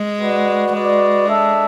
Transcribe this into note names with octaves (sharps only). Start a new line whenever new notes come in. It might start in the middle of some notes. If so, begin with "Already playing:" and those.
Already playing: G#3
F#4 B4 D5 F#5
G#3 F#4 B4 D5
D4 A4 E5